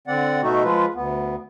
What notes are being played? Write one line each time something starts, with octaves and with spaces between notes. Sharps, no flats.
D3 C4 D5 F#5
B2 A3 D#4 F#4
F3 G#3 F4 B4
D2 B3